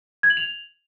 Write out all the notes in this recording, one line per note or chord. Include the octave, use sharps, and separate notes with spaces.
G#6
F#7
F7